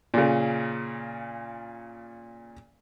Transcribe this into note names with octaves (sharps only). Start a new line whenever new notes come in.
A#2 C#3